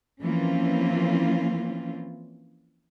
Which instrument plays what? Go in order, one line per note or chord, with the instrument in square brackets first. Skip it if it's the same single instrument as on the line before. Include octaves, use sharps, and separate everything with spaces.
[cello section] E3 F3 A#3 C4 C#4 F4